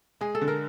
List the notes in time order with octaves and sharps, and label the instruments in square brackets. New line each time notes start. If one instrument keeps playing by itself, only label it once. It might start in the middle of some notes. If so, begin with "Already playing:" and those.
[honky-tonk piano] G#3 [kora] G#4
[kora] A4
[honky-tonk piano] D3
[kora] A#4